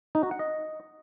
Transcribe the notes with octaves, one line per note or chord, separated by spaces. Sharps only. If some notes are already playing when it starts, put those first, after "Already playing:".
D#4
F#4
F#5
D#5